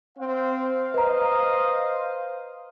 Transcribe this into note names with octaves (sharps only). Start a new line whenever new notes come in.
C4 C5 F5
B4 D#5 A#5